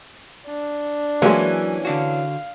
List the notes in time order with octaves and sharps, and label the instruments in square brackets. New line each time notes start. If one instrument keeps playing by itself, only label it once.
[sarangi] D4
[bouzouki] E3 C#4 [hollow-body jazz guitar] F#3 F#4 [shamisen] G#3 A#3
[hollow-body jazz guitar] D3 D4 F#4 [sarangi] F5